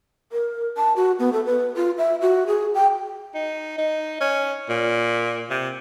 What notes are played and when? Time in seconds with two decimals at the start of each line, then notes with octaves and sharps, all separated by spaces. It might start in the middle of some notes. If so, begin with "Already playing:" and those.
0.32 A#4
0.77 A5
0.96 F#4
1.19 B3
1.33 A4
1.45 B4
1.76 F4
1.98 E5
2.21 F#4
2.47 G#4
2.75 G5
3.35 D#4
3.78 D#4
4.21 C#4
4.69 A#2
5.50 C3